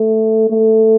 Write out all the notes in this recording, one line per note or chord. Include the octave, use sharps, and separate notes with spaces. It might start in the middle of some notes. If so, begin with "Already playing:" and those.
Already playing: A3
A3